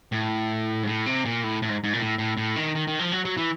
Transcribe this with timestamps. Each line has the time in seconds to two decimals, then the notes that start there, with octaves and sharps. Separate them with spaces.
0.12 A2
0.83 G#2
0.87 A2
1.06 C3
1.25 A#2
1.43 A2
1.62 A2
1.69 G#2
1.84 G#2
1.93 A#2
2.00 A2
2.18 A2
2.37 A2
2.56 D#3
2.75 D#3
2.87 D#3
2.99 F3
3.12 F#3
3.25 F#3
3.37 E3